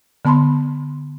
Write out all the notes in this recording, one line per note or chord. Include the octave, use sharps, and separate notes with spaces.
D3 B3 A5 B5 C6